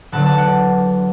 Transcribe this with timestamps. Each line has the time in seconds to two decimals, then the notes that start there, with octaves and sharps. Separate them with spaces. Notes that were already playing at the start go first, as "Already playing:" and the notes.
0.12 E1 E2 D3 F#3 F#5 A5
0.25 F#5 A5
0.38 D5 F#5